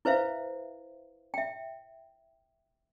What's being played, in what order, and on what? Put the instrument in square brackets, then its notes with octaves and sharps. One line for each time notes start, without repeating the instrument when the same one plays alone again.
[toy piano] E4 B4 C5 E5 F5
E5 G5